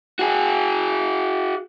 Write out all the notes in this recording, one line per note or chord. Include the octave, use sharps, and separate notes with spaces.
F#4 G#4